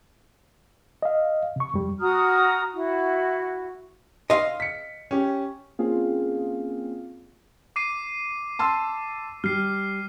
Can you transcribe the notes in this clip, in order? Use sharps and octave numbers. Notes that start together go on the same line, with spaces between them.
D#5 F5
C3 C#6
F2 G3
F#4 A#5 D#6 F6
E4 F#4
D#5 F5 C6
B6 C#7
C#4 G4
A#3 C4 C#4 F4 G#4 F5
D6 C7 D#7
A5 C6 E6
G3 F6 C7